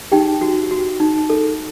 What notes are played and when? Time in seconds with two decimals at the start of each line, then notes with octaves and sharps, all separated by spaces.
0.12 D#4 G4 G5
0.41 F#4
0.71 F#4
1.00 D#4
1.30 A4